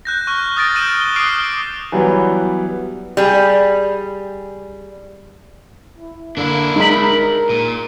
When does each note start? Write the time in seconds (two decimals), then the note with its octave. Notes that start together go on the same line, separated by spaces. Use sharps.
0.05 F#6 G6 A#6
0.27 C#6 F6 F#6
0.57 D#6 F6 A6 A#6 D7
0.75 E6 F6 G6 D#7 E7
1.00 G7
1.16 D6 D#6 F6 F#6 C7 D7
1.92 E3 F#3 G3 B3
3.17 G3 G#4
5.99 E4
6.37 D3 A#3 D4 E4
6.76 G#3 D#4 A#4 B5
7.49 A#2